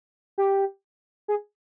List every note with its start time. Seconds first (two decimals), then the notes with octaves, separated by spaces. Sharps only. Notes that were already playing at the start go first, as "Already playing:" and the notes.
0.38 G4
1.28 G#4